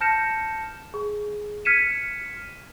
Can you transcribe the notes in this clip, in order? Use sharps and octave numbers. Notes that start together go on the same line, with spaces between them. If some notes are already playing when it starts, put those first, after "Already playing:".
A5 F6 G6 A#6 C#7 E7
G#4
F6 G#6 B6 C#7 D#7 E7